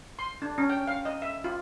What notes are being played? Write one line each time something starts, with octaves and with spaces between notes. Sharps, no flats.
C6
D4
C#4
G5
F5
D#5
E5
F4